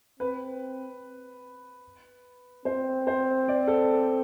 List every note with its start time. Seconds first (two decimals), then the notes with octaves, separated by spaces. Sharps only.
0.20 C4 B4
2.65 C4 C5
3.07 C5
3.48 D5
3.68 A4